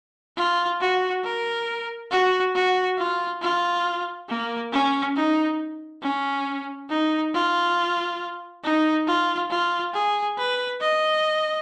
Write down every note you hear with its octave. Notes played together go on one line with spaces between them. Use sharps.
F4
F#4
A#4
F#4
F#4
F4
F4
A#3
C#4
D#4
C#4
D#4
F4
D#4
F4
F4
G#4
B4
D#5